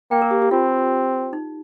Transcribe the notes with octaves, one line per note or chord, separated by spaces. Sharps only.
A#3 G5
A#4
G4
G4
C4 F4
D#4